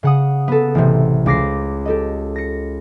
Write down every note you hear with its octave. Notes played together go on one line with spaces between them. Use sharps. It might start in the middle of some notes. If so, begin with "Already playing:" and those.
C#3 F#5 D#6
B3 A4
A1 C3
C#2 D6 A#6 C7
G4 A4 D#5
A#6 C#7